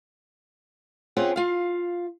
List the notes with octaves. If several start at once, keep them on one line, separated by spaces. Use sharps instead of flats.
C4 C#4 F4 G#4 F#5 G5
F4 F5